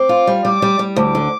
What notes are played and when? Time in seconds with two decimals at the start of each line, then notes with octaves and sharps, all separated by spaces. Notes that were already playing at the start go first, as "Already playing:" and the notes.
Already playing: C4 D6
0.09 F4
0.27 G3
0.45 G3 D6
0.62 G3
0.79 G3
0.96 D2 D6
1.15 D3